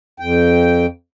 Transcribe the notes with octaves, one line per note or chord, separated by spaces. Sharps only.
F2 G5